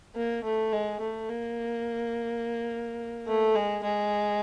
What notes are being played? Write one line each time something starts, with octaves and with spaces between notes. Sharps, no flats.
A#3
A3
G#3
A3
A#3
A3
G#3
G#3